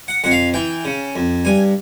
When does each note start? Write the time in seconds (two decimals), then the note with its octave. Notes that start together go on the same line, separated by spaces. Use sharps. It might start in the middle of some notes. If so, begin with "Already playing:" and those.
0.08 F#5
0.24 F2 F#5
0.31 F5
0.54 E3 G5
0.85 C#3
1.16 F2
1.45 G2 G#5